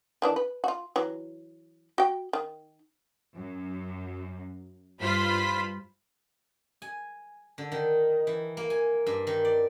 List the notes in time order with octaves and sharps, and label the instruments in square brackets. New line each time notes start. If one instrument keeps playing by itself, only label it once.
[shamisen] D#3 E3 D4
B4
F4 F#4
E3 F#3
F#4 G5
D#3
[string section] F#2
G2 F4 C5 B5 B6
[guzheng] G#5
D3
D#3
E3
A#3
G#5
G2
D#3
D5